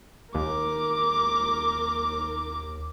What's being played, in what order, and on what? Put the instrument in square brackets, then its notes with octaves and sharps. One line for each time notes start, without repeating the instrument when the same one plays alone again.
[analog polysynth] D#2 [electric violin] A#4 D6